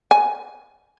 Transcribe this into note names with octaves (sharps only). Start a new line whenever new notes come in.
G#5